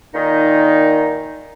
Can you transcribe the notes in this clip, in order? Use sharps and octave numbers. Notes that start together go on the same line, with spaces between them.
A#2 D#3 D#4